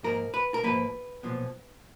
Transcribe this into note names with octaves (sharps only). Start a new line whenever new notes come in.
G#2 F3 A#3 A#4
B4
A#4
G#2 F3 A#3 B4
B1 A#2 F3 B3